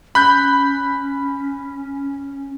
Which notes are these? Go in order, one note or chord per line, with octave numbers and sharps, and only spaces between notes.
C#4 B5 F#6 G6